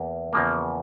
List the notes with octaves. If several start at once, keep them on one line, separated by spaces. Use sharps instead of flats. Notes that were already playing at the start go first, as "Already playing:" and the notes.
Already playing: E2 A#3
E2 C#3 F3 A#3